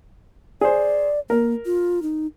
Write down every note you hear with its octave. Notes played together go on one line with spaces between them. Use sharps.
G#4 C5 D5
A#3 A#4
F4
D#4